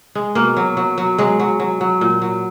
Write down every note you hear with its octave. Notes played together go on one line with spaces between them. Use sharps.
G#3
B2 A#3
F#3
F#3
F#3
F#3 G#3
F#3
F#3
F#3
A#2
F#3